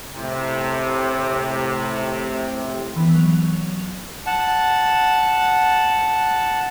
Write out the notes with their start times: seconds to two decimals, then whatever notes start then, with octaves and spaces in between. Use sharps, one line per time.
0.15 A2 C3
2.96 E3 B3
3.14 F#3 F7
4.26 F#5 A5